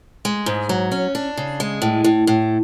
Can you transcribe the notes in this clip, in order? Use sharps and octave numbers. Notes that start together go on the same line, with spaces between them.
G#3
G#2
F#3
C#4
D4
C#3
G#3
A2
A2
A2